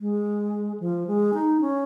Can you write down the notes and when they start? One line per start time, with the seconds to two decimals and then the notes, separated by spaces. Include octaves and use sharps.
0.01 G#3
0.80 F3
1.07 G#3
1.34 D#4
1.61 C#4